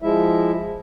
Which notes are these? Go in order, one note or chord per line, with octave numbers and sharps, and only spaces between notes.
F3 G#3 E4 E5